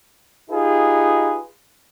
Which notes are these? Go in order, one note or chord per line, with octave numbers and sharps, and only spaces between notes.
D#4 F4 G4 G#4 B4